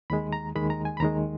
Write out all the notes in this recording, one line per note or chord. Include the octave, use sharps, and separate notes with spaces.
D#2 D#3 G#3 B5
A#5
D#2 D#3 G#3 B5
A#5
G#5
B5
D#2 D#3 G#3 A#5